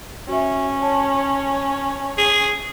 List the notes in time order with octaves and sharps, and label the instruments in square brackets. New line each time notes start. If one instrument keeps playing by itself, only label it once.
[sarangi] C#4 [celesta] F#4 E5
[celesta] C#5 A5
[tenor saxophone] G#4